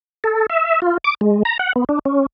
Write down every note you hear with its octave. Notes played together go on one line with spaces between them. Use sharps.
A4
E5
F4
D6
G#3
A#5
F#5
B3
D4
C#4